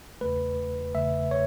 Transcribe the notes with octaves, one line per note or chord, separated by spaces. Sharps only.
E2 C#3 A3 B4
E2 C#3 A3 E5
C#5